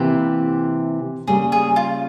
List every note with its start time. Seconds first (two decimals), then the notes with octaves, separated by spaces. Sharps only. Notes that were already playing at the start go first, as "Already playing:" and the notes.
Already playing: C3 E3 A#3 G4
1.27 C#3 G3 A#3 G#4
1.52 G#4
1.76 F4